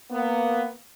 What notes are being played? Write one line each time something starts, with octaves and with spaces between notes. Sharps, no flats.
A#3 B3